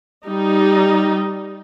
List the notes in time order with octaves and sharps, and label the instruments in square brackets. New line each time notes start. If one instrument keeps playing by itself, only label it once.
[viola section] G3 D#4